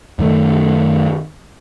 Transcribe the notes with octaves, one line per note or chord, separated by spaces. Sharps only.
F#2 D#3 A3